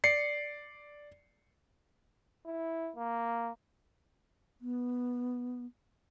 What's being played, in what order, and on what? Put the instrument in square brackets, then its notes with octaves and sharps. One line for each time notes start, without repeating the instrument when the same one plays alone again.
[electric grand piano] D5 C7 C#7
[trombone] E4
A#3
[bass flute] B3